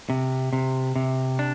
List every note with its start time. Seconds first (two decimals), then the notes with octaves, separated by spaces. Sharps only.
0.10 C3
0.53 C3
0.96 C3
1.39 D4